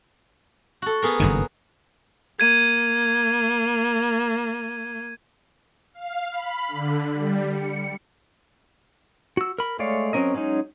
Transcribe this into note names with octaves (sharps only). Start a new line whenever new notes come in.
F#4 A4
B3 G#4 A#4
F#1 G2 D#3 F#3
A#3 G#6 D#7
F5
B5
D3
G3
C#7
F#4 E6
A#4 B5
G#3 A3 C#5 D5 F5
F#3 C4 C#4 A#4 D#5
F#3 G#3 C#4 D#4